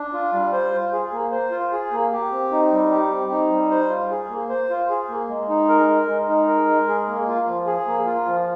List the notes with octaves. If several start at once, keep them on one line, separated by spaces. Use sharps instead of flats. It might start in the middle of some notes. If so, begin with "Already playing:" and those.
Already playing: D4
F4
G3
C5
F4
G#4
A#3
C5
F4
G#4
A#3
G4
C4
D#4
G3
G4
C4
D#4
G3
C5
F4
G#4
A#3
C5
F4
G#4
A#3
G#3
D#4
A#4
G#3
G#3
D#4
A#4
G#3
G#4
A#3
F4
F3
G#4
A#3
F4
F3